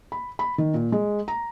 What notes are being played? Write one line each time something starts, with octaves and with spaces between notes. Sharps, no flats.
B5
B5
D#3
A#2
G#3
A#5